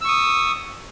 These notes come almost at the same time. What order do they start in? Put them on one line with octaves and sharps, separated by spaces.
E6 C#6 D#6